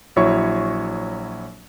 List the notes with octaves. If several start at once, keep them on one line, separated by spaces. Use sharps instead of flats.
A#1 F#3 E4 C#5 C#6